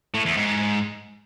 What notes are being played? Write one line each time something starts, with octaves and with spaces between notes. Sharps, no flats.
A2
E2
G#2